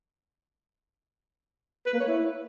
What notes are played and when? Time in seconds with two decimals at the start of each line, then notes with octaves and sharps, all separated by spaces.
1.86 B4
1.93 A#3
2.00 C#5
2.07 E4